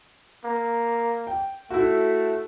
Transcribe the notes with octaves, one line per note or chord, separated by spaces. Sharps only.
A#3
G5
A3 E4 F#4